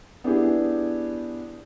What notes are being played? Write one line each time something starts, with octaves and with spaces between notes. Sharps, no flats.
B3 D4 E4 G4 G#4